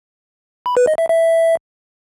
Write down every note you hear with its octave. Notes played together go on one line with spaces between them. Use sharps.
B5
B4
D#5
E5
E5